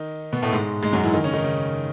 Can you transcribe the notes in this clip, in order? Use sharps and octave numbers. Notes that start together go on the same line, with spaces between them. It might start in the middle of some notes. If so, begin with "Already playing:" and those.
Already playing: D#3 D#4
B2 B3
A2 A3
G#2 G#3
G#2 G#3
F#2 F#3
E3 E4
D#3 D#4
C#3 C#4
D#3 D#4
C#3 C#4